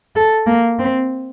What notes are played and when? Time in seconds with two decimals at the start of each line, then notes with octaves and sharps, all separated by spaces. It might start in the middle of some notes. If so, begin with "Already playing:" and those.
0.16 A4
0.47 A#3
0.79 C4